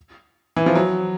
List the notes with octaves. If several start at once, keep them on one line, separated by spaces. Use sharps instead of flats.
E3
F3
F#3